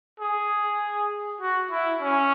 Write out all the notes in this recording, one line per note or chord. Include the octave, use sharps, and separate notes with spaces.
G#4
F#4
E4
C#4